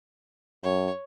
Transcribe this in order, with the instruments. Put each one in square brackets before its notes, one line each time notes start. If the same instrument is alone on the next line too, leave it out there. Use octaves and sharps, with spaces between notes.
[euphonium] F#2 [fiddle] C#5